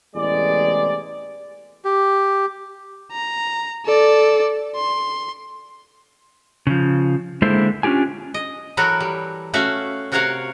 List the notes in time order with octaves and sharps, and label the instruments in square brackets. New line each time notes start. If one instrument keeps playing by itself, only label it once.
[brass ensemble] A1 E2 C3 G#3 D5
[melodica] G4
[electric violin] A#5
A4 D5
C6
[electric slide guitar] C#3 F3
D3 G#3 A#3 E4 A4 C5
C#4 D4 F4 G4 G#5
[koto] D#5
E3 F#3 E4 F#4 A4 A#4
G3
A3 C#4 F#4 E5 F5
C3 F#4 A#4 C#5 F5 F#5